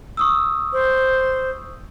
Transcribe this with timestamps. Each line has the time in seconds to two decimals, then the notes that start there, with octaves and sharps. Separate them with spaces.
0.17 C#6 D#6 E6
0.73 C5